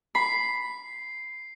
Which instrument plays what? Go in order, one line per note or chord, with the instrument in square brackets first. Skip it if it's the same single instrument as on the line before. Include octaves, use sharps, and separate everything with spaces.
[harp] B5 [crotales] C7